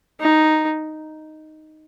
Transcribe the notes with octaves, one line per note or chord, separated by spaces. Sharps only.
D#4